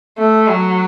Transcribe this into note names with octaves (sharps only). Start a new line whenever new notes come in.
A3
F#3